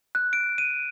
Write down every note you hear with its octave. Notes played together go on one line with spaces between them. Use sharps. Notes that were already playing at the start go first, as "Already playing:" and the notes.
F#6
D7
D#7